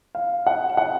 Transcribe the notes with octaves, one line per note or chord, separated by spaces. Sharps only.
F5
F#5
F#5